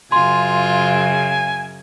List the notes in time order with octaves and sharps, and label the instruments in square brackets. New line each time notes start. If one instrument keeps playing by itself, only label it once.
[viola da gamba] F#2 C#3 [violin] F4 [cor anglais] G#5 [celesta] C6